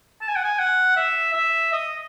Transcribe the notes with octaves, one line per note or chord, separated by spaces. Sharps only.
A5
G#5
F#5
G#5
F#5
E5
E5
D#5